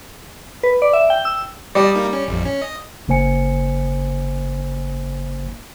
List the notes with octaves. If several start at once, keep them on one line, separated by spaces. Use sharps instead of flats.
B4
D5
E5
G5
E6
G3 D5 D#5 A5
A#3 D#4
C#4
A1 F2
C#4
D#5
G1 C#3 A#3 C5 G#5 C#7